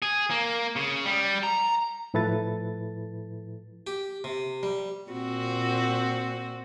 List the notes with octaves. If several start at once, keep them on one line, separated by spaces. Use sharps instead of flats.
G#4
A#3
C#3
G3
A#5
A2 F3 E4 A4 B4 A6
G4
C3
G3
A#2 C4 F#4